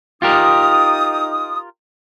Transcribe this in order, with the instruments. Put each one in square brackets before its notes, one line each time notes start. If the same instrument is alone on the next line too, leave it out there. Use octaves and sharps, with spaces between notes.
[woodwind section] D#4 D#6 [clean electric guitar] F4 G4 A#4